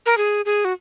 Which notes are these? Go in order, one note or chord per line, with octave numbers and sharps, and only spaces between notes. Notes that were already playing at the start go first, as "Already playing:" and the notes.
A#4
G#4
G#4
F#4